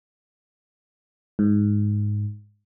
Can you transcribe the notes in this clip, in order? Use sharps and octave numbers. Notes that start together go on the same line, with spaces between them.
G#2